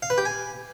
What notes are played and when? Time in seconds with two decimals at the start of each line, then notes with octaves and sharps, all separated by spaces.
0.02 F5
0.10 B4
0.18 G4
0.25 G#5